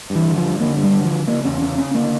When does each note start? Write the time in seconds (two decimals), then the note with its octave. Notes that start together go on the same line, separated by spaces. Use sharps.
0.10 G2
0.15 E3
0.26 D3
0.38 F3
0.43 G2
0.60 D3 A#3
0.77 G2
0.83 G3
0.93 D3
1.04 F3
1.11 D3
1.28 C#3 A#3
1.44 E2 C#4
1.62 C#3 C#4
1.78 C#3 C#4
1.94 D3 A#3